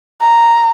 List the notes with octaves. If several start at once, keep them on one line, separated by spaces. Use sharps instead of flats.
A#5